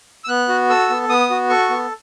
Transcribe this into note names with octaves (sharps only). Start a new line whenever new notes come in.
E6
B3 F#6
F#4
A4 E6
B3
B3 D#6
F#4
A4 C#6
B3